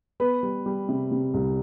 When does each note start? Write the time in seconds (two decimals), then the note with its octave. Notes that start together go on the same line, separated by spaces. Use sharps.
0.20 B3 B4
0.43 G3
0.66 G3
0.89 C3
1.11 C3
1.34 C2